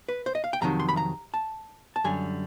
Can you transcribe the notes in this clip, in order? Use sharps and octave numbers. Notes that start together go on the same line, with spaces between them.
B4
C5
D#5
F5
G5
F2 C3 D#3 F#3 A#5
C6
B5
A#5
A5
A5
F#2 D3 G3 G#5